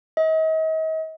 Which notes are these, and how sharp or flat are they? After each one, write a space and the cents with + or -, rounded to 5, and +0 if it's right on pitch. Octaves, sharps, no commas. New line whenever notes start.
D#5 +40